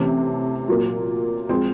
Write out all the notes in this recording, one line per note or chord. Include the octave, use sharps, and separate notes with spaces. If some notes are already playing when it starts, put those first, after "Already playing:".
Already playing: C3 E3 A3 C#4
A#2 F#3 A#3
F3 G#3 C4